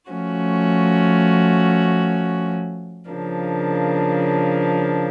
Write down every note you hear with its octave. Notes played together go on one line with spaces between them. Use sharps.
F3 A3 C#4 F#4
C#3 F3 A#3 D4